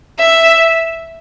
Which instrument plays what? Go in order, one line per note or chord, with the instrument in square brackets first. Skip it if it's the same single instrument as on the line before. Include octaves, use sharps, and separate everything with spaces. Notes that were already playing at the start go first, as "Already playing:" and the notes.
[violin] E5